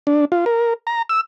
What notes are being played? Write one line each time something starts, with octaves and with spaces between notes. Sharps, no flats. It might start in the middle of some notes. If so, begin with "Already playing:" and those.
D4
F4
A#4
A#5
E6